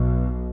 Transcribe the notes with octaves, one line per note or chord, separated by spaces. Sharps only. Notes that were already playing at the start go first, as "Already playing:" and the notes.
Already playing: B1 B2